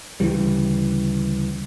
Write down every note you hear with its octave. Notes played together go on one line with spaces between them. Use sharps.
D2 C#3 E3 G3